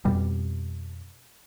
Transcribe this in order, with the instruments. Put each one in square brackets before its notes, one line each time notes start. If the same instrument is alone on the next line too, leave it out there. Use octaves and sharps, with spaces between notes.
[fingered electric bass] F2 B2 G3